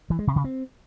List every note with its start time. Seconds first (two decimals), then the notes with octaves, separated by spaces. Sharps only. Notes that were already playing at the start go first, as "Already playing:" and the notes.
0.10 E3
0.19 G#3
0.27 C3
0.36 C#3
0.44 C4